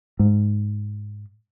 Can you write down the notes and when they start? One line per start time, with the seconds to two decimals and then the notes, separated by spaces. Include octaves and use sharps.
0.19 G#2